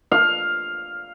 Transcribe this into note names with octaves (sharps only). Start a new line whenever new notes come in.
F5